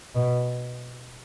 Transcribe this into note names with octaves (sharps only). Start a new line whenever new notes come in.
B2